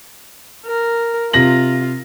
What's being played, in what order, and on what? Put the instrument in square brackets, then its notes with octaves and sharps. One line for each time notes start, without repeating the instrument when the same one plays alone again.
[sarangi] A#4
[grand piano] C3 A#6 F#7 [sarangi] F4